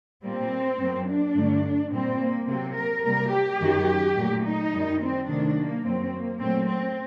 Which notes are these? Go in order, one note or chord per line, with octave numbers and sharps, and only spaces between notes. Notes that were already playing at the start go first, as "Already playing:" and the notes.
A#2 G3 A#3 C4
F#2 F#3 A#3
D4
G2 D3 F#3 A3
A#2 G3 A#3 C4
A#3
C3 F#3 A#3 C4
A#4
C3 G3 A#3 A#4
G4
F#2 D#3 F#3
A#2 F#3 A3
D#4
F#2 D#3 G3
C4
C3 D#3 F#3 A3 D4
A#3
F#2 F#3 A#3 C4
A#3
A#2 F#3 A3 C4
C4